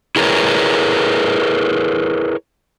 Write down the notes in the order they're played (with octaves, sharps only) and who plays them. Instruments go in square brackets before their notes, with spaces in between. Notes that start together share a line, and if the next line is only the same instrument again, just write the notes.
[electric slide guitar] E4 G#4 A#4 B4 C#5